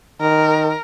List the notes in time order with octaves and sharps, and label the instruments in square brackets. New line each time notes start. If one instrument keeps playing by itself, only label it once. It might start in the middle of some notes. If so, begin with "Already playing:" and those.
[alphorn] D#3 [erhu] A#4